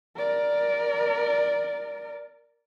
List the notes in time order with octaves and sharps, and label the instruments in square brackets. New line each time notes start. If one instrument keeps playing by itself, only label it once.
[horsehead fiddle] A#4 D5